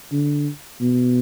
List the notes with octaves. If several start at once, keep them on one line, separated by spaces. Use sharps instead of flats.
D3
B2